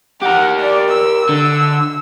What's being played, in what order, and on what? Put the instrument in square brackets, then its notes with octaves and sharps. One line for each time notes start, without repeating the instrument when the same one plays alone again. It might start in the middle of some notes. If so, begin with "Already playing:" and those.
[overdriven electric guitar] G4 A#4 [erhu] F#5
[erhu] D5
E6
[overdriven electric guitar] D3